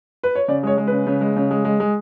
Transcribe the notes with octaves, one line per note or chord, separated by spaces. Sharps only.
B4
C#5
C#3 D5
G#3 C#5
G#3
C#3 B4
C#3
G#3
C#3
G#3
G#3
G#3